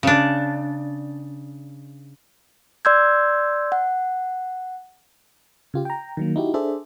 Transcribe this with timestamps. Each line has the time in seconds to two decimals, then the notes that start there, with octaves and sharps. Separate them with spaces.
0.03 C#3 D4
2.85 D5 C6 E6 G6 G#6
3.72 F#5
5.74 C#3 F4 G4
5.85 G5 A#5
6.17 D#3 F#3 A#3
6.36 D#4 E4 F#4 G4
6.54 D4 G#4 A4 C5 D5 E5